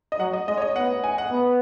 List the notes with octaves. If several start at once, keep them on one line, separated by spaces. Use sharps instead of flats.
D#5
F#3 F#5
D#5
G#3 D#5
C#5
D#5
B3 F#5
G#5
F#5
B3